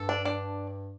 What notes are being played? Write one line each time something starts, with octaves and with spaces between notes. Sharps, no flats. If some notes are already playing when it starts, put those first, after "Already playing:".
Already playing: G2 A4
D4
D4